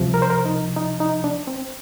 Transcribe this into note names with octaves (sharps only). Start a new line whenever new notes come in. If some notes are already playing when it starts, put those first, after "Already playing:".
Already playing: C2 C3 F3
A#4
C5
A#4
D#4
D#4
D#4
D4
C4